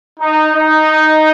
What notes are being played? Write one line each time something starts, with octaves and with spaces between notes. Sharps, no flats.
D#4
D#4